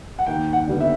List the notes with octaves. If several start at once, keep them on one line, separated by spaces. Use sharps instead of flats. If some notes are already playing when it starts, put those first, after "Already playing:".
F#5
D#2 G5
F#5
D3 G3 B3
E5